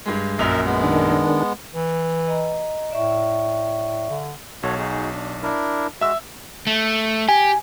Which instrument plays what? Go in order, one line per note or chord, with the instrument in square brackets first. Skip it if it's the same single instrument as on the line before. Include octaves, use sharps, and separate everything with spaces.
[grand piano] G2 G#3
[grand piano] A#1 F#2 F7 [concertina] A#4 D#5 E5
[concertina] G#3 B3
[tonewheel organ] D#3 D4
[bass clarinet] E3
[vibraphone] D#5 A#5
[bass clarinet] A2 [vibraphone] D5 E5 C#6
[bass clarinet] D3
[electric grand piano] B1 [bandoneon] F#4 A4 C#5
[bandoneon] D#4 F#4 G#4
D4
D4 E4 A#4
[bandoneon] G#3 F#4 [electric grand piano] E5 E6
[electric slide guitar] A3
[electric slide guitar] G4 [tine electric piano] G#5